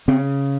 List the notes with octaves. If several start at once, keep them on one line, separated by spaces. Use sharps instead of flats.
C#3 C4